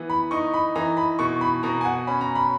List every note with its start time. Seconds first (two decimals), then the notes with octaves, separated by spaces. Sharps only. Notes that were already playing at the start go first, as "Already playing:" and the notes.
Already playing: E3 B3
0.10 B5
0.31 D#4 C#6
0.54 B5
0.76 E3 A#5
0.97 B5
1.19 B2 C#6
1.41 B5
1.63 B2 A#5
1.81 G#5
1.85 F#5
2.07 C#4 B5
2.21 A#5
2.35 B5